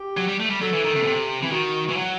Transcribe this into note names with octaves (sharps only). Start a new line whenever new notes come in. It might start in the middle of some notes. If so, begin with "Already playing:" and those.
Already playing: G4
F#3
G3
A3
G3
F#3 A4
E3
D#3
C3
B2
C3
E3
D#3 F#4
E3
F#3